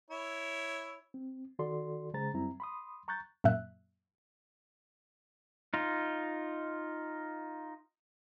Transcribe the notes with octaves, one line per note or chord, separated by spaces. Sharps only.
E4 C#5
C4
D#3 F#4 A4 D5 C6
C#3 G#3 G#4 C5 A#5 A6
F#2 G3 C4 E4 A#5
B5 C6 D#6
A#5 C#6 F#6 G6 A6
F#2 A#2 E5 F#6
D#4 F4